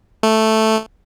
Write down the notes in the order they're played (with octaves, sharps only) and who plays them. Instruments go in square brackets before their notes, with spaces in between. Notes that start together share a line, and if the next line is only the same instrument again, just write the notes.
[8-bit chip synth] A3